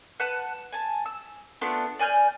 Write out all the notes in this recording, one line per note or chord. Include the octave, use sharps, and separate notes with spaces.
B4 F#5 A5 F#6
G#5 A5
E6
A3 B3 D4 F4
D5 G#5 F6 G6